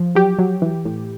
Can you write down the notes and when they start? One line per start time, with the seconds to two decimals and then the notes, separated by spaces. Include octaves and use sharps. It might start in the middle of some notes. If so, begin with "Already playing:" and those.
Already playing: F3
0.15 F#3 G4
0.39 F#3
0.62 E3
0.85 A2